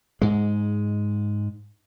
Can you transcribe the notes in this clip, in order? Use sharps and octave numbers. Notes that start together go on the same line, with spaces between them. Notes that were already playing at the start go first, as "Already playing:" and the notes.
G#2 G#3